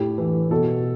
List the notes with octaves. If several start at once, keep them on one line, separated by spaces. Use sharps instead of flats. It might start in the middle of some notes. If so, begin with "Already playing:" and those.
Already playing: A2 G4
E3
B2 A4